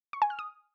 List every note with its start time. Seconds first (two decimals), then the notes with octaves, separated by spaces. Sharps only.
0.13 C#6
0.22 G#5
0.30 F6
0.39 D#6